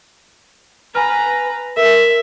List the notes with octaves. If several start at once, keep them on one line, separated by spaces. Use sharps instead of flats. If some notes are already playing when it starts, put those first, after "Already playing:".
B4 G#5 A#5 F6
A#4 E5